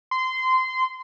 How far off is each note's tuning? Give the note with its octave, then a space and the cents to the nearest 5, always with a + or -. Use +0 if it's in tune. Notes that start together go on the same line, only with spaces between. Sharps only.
C6 -20